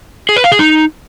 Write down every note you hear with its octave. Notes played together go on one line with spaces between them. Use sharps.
G#4
B4
F5
G#4
D#4